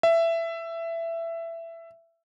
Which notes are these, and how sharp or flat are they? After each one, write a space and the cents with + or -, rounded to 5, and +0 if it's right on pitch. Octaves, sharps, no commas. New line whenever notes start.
E5 +15